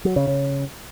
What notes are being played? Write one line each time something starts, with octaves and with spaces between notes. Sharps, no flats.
F#3
C#3
C#3